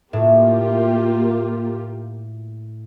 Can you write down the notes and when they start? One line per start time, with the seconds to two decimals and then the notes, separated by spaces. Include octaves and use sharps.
0.13 A2 A#3 F4 G4